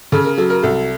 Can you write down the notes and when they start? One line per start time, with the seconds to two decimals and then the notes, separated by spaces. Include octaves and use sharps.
0.12 C#3 A4
0.24 A#4
0.38 F#3 A4
0.50 A#4
0.63 C2 A4